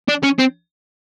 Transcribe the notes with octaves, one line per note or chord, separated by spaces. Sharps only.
D4
C#4
C4